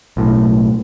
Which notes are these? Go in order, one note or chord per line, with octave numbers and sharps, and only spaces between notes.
B1 A2